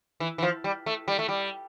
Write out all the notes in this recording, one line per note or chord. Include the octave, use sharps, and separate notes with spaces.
E3
E3
F3
G3
A3
G3
A3
G3